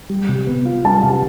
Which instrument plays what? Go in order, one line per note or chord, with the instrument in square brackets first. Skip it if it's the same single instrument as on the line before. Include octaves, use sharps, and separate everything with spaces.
[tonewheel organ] G3
C3
B3
F4
[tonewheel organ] G3 [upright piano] A5
[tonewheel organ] C3